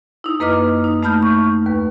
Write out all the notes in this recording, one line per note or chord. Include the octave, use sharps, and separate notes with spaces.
D#4 E4
F#2 A#3 B4 D#5 D6 F6
D#4
A3 D#4 A5 B5 F6 G6
C#6
D#2 B4